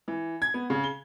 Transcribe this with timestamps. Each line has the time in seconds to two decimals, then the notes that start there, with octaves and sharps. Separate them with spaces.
0.08 E3
0.42 G#6
0.54 B3
0.70 C#3
0.84 G7